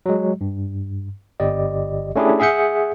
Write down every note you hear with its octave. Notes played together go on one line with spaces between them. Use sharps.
F#3 G#3
G2
G1 G4 D5 D#5
A3 C#4 D4 E4 G4 G#4
G#4 E5 F#5 G6 C#7